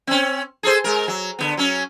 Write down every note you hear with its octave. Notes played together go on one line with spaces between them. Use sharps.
C4 C#4
G#4 A4 C5
G#3 A#4
F#3
D3 F3 B3
F#3 C#4